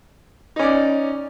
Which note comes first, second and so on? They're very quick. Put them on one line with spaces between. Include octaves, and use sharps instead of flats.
D#4 C#4 D5